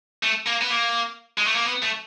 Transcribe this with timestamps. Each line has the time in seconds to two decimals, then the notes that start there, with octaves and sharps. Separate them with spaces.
0.23 A3
0.47 A#3
0.61 B3
0.70 A#3
1.38 G#3
1.47 A3
1.55 A#3
1.65 B3
1.83 A3